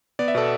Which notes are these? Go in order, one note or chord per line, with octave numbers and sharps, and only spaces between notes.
B3 D5
E5
B2 A4 D5